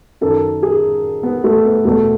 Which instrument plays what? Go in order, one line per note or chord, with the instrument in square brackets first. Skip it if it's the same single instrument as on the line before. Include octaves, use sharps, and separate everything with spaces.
[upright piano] F#2 D#3 A4
G#4
B3
A3
B3
E2 B2 A3